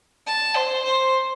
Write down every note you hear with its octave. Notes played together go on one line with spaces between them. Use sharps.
A5
C5
C5